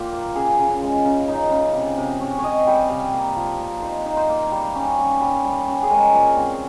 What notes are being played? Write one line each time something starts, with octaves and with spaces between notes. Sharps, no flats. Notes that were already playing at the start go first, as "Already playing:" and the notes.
Already playing: A#2 F4 G4
A#3
C#3 G#4
C#3
G#3
C#3
D#4
C#3
C3
C3
C#4
C#5
C3 D#5
G3 G5
C3 F5
A#3
F3
A#3
D#4 C5
D#4
C5
A#3
G3
C#4
G3
G3
G3
C#4
G#4
G#3 A#4
A#2
C4